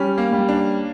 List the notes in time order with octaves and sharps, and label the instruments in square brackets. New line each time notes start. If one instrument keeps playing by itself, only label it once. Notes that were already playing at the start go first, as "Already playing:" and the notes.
Already playing: [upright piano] G3 [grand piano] C#4
[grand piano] A#3
[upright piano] G3
[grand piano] D4